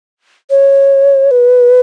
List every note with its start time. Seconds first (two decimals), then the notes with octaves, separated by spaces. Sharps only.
0.50 C#5
1.31 B4